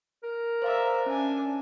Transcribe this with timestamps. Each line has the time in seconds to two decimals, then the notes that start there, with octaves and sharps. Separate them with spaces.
0.23 A#4
0.62 C5 D5 E5 F5 A#5
1.06 C#4 D4 G#5